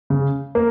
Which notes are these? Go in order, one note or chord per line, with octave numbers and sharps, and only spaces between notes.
C#3
A#3